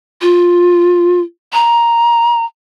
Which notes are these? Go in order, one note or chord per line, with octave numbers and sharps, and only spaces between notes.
F4
A#5